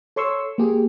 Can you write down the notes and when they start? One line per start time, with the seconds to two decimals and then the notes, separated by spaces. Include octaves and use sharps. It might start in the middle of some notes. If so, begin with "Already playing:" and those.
0.16 A4 C#5 C6 C#6 E6
0.58 A#3 G4 G#4